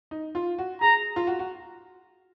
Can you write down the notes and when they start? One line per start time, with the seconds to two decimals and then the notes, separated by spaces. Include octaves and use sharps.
0.11 D#4
0.35 F4
0.58 F#4
0.81 G#4 A#5
1.16 F4
1.27 F#4
1.39 F#4